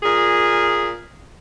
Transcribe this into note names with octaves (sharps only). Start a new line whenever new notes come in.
A#2 G#4